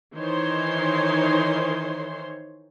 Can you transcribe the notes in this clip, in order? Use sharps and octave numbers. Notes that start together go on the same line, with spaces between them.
D#3 E3 D#4 C5 C#5 C6